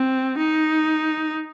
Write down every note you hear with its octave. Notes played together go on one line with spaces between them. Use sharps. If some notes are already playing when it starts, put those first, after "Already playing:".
Already playing: C4
D#4